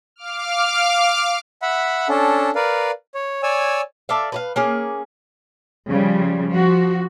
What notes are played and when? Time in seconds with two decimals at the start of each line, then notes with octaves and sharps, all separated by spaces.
0.16 F5 D6 F6
1.62 E5 F#5 B5
2.09 C#4 D4 A4
2.55 A#4 B4 D5 F5
3.15 C#5
3.43 C#5 D5 G#5 E6
4.09 A4 D5 E5 F5
4.32 B4 D5 F5
4.56 A#3 C#4 G#4
5.88 C#3 F3 G3
6.50 F3 F#4